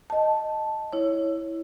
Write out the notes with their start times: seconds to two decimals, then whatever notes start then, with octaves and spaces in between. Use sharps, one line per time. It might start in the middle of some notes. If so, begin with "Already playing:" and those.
0.10 D#5 A5
0.93 E4 C#5